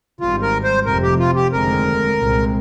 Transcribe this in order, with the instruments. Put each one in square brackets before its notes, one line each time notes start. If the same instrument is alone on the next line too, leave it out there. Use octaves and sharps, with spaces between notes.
[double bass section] G#1 G#2 G3 [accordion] F4
[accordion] A#4
C5
[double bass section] F1 F2 C3 [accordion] A#4
[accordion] G4
F4
G4
[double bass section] F1 D#2 D3 G#3 C4 [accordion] A#4
[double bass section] C2 A#2 G#3 C4